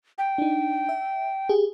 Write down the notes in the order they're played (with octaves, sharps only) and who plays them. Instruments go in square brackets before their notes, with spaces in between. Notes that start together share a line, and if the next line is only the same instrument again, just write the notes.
[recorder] G5
[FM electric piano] D4 D#4
E5
G4 G#4